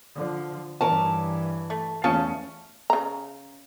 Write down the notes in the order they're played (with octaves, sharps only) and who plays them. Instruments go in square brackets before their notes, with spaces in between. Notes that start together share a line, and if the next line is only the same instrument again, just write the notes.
[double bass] D3 F3
[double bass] G2 E3 [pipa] C#4 A#4 [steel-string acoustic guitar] A5
[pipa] A3
[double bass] E2 A3 [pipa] C#3 F4 A5 [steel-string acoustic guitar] C#4
[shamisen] C#3 A#5